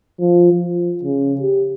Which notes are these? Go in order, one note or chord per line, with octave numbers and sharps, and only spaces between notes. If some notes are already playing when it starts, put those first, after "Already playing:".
F3
F3
C#3
G4